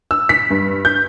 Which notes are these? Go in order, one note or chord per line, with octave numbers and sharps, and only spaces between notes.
E6
B6
G2
G6